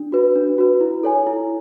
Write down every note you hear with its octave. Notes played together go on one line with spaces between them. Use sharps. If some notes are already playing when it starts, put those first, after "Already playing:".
Already playing: D4
F#4 B4
D4
F#4 B4
E4
A4 C#5 G#5
E4